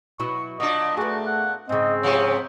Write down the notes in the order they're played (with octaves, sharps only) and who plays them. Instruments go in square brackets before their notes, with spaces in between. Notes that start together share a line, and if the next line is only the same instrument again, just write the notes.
[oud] B2 F#3 E4 [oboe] C#6
[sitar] A#2 D4 [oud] F#3 [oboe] D#5
[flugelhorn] A3 [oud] B3 G#4 [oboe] F#4
[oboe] F#5
[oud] G#2 C#3 [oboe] C4 [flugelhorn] D#5
[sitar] C3 F3 B3 [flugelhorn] C#5